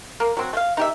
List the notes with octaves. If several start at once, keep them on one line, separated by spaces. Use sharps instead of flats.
A#3
F#3 C4 F#4
A3 F5
D#4 G4 E5